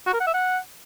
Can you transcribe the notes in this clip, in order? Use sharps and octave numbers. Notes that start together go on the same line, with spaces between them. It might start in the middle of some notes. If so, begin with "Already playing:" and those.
F#4
A#4
F#5
E5
F#5